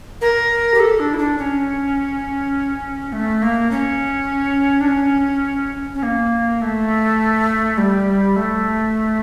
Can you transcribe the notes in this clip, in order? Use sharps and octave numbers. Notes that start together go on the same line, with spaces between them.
A#4
G4
A4
D4
E4
D4
C#4
A3
A#3
C#4
D4
C#4
C#4
A#3
A3
G3
A3